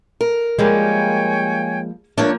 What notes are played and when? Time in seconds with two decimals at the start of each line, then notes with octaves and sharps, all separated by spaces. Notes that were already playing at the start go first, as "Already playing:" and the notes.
0.21 A#4
0.59 F3 G3 G#3 A#3 C#5 G5 G#5
2.18 F3 A#3 D4 C#5